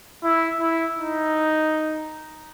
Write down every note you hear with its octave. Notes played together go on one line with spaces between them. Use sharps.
E4
E4
D#4